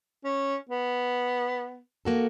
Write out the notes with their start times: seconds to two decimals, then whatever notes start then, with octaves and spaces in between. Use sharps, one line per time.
0.24 C#4
0.69 B3
2.05 A#3 F#4 A4